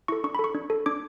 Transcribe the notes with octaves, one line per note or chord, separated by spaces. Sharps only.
E4 A4 C#6
D4 C#6
B5
A4
C#6
D4
A4
D4 D6